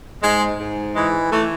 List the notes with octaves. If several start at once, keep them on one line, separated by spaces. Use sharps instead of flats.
G#2 G#3
G#2
E3 G#3
E3 A3